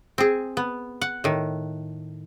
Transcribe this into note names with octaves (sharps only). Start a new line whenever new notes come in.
C4 G#4
B3
F#5
A2 D#3